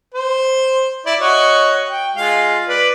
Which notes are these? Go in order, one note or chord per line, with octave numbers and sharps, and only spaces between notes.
C5
E4 D5
F#4 C#5 D#5
G5
G#3 F4 F5
B4 D5